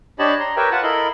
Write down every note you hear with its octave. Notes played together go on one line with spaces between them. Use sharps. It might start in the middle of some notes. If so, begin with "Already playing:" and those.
D4 G4 C#5 D#5 A5 B5
A#5 C6
G4 A#4 B4 C#5 E5 G5
F4 B4 F#5 A5
E4 A4 A#4 D#5 B5 C6